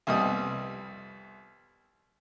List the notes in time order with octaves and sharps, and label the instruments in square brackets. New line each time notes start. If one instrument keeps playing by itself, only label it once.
[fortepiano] C2 F2 G3 B3 D#5 D#6